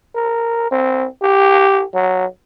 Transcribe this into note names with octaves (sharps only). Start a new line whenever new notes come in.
A#4
C4
G4
F#3